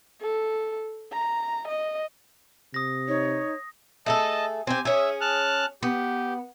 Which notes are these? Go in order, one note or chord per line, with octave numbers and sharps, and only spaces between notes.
A4
A#5
D#5
C3 D#6 A#6
D#4 C#5
A3 G#4 A4 D#5 A5
C4 G4 G#5
C#4 G#4 E5
A5 F6 F#6
B3 G4